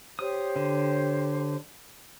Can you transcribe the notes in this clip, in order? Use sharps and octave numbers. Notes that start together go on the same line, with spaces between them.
G4 C5 C#5 D#6
D3